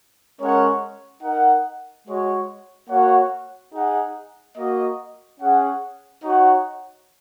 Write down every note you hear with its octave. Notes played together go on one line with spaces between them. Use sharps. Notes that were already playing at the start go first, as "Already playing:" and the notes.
G#3 C#4 A#4 C#5 F#5
D#4 A#4 F#5
G#3 F#4 C#5
A#3 F#4 C#5 F#5
D#4 G#4 F#5
A#3 F#4 D#5
C#4 G#4 F#5
D#4 F#4 C#5 F#5